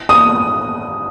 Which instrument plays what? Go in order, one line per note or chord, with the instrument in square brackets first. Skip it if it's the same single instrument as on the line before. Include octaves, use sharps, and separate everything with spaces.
[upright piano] D#6